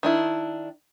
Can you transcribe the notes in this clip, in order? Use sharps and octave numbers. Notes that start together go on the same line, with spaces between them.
D#3 D4 E4